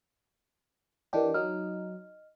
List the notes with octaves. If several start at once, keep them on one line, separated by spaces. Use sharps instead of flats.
E3 D4 G4 A#4 D#5
F#3 D#4 D#5 F6